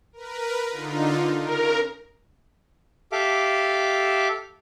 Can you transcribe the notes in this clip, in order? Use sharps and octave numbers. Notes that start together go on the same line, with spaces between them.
A#4 B4
D3 D#4 F4
C#3 A#4
G4 A4 E5 F5 D6